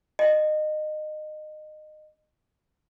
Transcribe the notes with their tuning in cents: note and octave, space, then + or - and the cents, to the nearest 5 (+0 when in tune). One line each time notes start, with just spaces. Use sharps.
D#5 -25